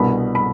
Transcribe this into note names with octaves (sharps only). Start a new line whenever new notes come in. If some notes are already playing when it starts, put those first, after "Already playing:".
Already playing: C2 B2 B3 D4 B5
B5